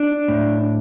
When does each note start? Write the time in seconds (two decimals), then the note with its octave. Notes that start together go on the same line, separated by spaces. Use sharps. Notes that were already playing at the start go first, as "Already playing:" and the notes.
Already playing: D4
0.28 A2